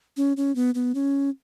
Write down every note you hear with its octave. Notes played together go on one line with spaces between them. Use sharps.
C#4
C#4
B3
B3
C#4